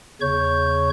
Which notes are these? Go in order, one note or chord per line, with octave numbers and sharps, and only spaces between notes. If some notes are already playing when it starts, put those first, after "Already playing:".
E2 C#3 C#5 C#6 G6